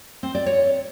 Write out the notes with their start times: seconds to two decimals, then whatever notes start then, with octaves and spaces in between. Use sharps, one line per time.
0.23 C4
0.35 D5
0.46 C#5